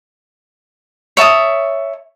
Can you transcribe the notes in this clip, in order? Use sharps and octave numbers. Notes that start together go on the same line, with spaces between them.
C#5 E5 A5 D#6